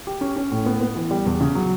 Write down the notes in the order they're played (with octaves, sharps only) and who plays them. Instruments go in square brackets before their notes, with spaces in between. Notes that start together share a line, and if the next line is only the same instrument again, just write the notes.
[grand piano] G4
C#4
C#4
A2
B3
B3
E3
G3
E2
C#3
F#3